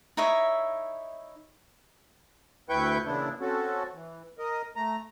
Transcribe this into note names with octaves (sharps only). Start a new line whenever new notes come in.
D#4 E4 C#5 E5
D2 E4 B4 G5 C#6 G6
A#2 C#3 E3 B3 D4 E4
C4 C#4 F#4 A4
E3
A#4 D#5
A3 A#5